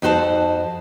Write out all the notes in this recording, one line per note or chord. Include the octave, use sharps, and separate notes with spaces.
F2 D#4 F#4 C5 A5